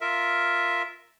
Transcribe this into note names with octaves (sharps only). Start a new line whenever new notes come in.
F4 A#4 E5